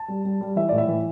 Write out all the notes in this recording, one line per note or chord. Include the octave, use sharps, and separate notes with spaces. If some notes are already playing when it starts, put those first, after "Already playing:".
Already playing: A5
G3
G3
G3
E3 E5
A2 D5
E5
E3